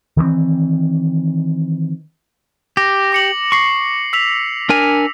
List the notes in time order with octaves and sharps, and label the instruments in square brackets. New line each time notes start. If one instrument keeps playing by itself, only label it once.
[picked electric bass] D#3 E3 G#3 C4
[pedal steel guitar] G4 [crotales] A#6
[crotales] D6 C#7 F#7
[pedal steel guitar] C#6 [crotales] C7 C#7
[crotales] E6 B6 F7
[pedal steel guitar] D4 A#4 G#5